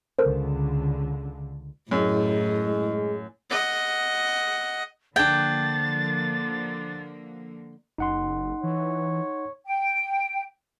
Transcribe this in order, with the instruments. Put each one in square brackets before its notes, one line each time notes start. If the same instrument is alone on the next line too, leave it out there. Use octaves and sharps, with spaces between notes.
[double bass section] C#2 D3 [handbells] A4 A#4 C5
[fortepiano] F#2 [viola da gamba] A2 [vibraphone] E4 G#4 D#5
[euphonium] G#3
[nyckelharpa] D#5 F#5
[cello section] D3 F3 A#3 [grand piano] D4 G#6 [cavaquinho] G5 [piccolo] A6
[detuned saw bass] F#1 [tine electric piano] D#4 F#5 C6
[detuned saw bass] E3 [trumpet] C#5
[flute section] G5